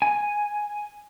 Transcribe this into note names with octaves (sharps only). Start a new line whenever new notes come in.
G#5